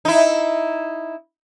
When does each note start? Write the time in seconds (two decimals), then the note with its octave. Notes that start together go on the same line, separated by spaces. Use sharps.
0.05 D#4 E4